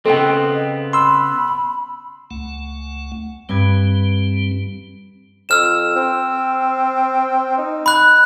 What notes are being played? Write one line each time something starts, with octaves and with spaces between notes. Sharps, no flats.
C#3 B3 C4 A4 D#5 G5
B5 C6 E6
C#2 A3 F#5
G2 G3 C4 B4 G#6
F2 E6 F6 E7
C4
D#4
B5 F#6